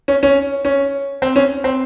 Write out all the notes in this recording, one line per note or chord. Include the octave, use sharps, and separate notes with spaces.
C#4
C#4
C#4
C4
C#4
C4